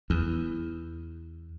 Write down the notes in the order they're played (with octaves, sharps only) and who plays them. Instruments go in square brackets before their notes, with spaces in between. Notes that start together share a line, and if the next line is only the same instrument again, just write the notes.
[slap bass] E2